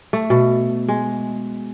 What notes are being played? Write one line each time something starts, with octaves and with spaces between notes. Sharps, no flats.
A3
B2
G#3